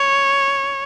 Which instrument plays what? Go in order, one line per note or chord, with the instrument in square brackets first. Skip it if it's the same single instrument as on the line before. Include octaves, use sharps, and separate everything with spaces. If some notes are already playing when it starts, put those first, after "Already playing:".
Already playing: [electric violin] C#5